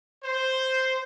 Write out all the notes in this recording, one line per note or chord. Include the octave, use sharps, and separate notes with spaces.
C5